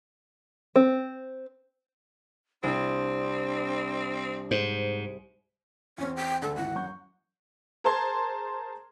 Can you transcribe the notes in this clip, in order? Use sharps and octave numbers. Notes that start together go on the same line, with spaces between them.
C4
C2 C4 D4 D7
G#2 C5
E2 C4 C#4
G5
D2 D3 A4
G#1 E3 F#5
F#2 C#6 G6
G#4 A#4 C5 A5 C6 G#6